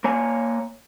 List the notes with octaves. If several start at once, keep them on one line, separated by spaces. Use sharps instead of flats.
A#3 C#5 G#5